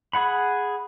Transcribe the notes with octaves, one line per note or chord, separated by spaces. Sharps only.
G#4 F#5 B5